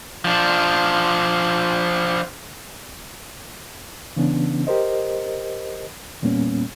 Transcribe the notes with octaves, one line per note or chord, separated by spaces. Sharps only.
F3 D4
C#3 E3 B3 C#4 D4
G4 A#4 C5 D#5
E2 A#2 G3 A#3 B3 C#4